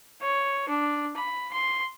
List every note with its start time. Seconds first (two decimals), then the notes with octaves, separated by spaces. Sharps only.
0.22 C#5
0.69 D4
1.17 B5
1.53 C6